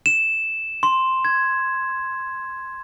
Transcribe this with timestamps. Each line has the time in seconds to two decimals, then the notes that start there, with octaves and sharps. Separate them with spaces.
0.06 E7
0.83 C6
1.25 G#6